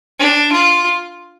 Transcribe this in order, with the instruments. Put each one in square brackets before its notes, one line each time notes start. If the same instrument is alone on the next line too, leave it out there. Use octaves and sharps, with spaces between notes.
[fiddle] D4
F4